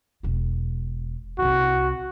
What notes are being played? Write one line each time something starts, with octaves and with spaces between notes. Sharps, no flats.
E1 F4
C2 E4 F#4